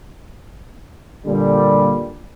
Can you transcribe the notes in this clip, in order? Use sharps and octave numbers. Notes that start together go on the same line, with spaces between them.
A#2 D3 G3